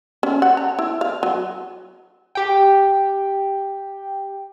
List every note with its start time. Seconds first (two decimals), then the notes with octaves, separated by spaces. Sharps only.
0.23 C#4
0.42 F#5
0.57 A#5
0.79 E4
1.01 F5
1.23 F#3
2.35 G4 G5